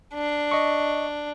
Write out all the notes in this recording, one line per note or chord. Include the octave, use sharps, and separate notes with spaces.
D4
D#5 C#6